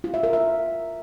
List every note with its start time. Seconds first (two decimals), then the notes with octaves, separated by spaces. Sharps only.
0.04 F4
0.14 E5
0.23 A#4
0.33 E5